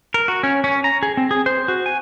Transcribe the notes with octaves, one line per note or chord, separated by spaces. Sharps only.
A#4
F#4
C#4
C#4
A#5
G#4
C4
G#4
C5
F#4
G#5